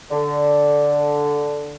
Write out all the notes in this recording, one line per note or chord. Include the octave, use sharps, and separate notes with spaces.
D3